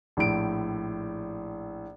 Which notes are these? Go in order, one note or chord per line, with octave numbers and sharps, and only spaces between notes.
A#1 A2 D7